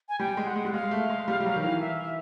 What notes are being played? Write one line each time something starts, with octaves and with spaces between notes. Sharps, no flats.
G#5
G3 G5
G#3
F#5
G#3
G3
G#3 F5
A3
G#3
G3
G3
F#3
D#3
E3
E5